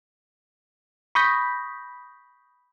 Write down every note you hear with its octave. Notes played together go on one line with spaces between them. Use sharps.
B5 C#6 D#6 G6 A#6 B6